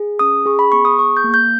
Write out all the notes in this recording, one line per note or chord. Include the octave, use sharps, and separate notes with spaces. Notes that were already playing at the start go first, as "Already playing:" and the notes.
Already playing: G#4
C#4 D#6
G#4 C#6
B5
B3 C#6
D#6
G#4 C#6
G6
A#3
G6